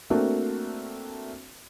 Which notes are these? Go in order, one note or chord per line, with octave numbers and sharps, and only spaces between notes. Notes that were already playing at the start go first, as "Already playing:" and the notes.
A3 A#3 C4 D4 F#4